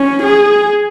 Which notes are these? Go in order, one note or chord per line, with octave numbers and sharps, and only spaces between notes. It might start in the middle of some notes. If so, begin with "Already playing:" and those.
Already playing: C#4
G#4